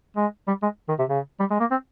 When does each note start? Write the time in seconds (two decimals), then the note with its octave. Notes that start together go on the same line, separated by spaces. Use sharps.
0.17 G#3
0.48 G3
0.63 G#3
0.89 D#3
0.99 C3
1.09 C#3
1.40 G3
1.50 G#3
1.60 A#3
1.71 C4